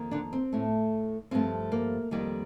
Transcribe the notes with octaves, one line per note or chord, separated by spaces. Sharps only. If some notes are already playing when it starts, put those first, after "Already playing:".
Already playing: F2 D#3 A#3
D3 D4
C4
A2 A3
G2 F3 A3 C4
A#3
F2 D#3 G3 A#3